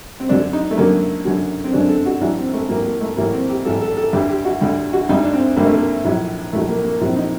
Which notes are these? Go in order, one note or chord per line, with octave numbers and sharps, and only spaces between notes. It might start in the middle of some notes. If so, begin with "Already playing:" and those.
C4
F#2 D3 F#3 D4
D#4
A3
F#2 D3 F#3 A#3
F#2 D3 F#3
C4
F#2 D3 F#3 D4
A4
F#4
A1 A2 F#3 D4
C4
A3
A1 A2 F#3 A#3
A#3
A3
A1 A2 F#3 A#3
C4
G4
A1 A2 F#3 A4
A4
A4
D2 D3 G3 G4
G4
F#4
D2 D3 G3
F#4
D2 D3 G3 D#4
D4
C4
D2 D3 G3 A#3
A3
A#3
A#1 A2 F#3
A#1 A2 F#3 A3
A#3
A#3
A#1 A2 F#3 C4
D#4